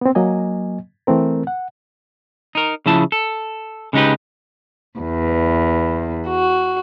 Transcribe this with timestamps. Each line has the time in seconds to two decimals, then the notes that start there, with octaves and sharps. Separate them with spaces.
0.01 B3 C4
0.15 F#3 A#3 D#5 G#5
1.07 E3 A3 C4 A#4
1.47 F#5
2.55 D#4 A#4
2.86 C#3 F3 E4 A5
3.12 A4
3.93 C#3 G#3 D#4 G4 B4
4.99 E2
6.28 F#4